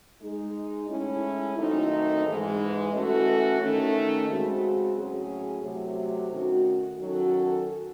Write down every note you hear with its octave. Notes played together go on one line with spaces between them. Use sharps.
G#3 D#4 G#4
A2 G#3 C#4 E4
F#2 D#3 A3 C4 D#4
G#2 E3 G#3
E3 A3 C#4 F#4 A4
D#3 A3 C#4
C#3 G#3 C4 F#4
A2 F#3 C#4 G#4
C3 F#3 A3
D#3 A3 C#4 F#4
D#3 F#3 C#4 F#4 A4